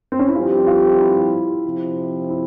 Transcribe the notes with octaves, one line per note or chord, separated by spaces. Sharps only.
C4
C#4
E4
G2 F3 C4 F4 G4
F4
E4
C3 F3 C4
E4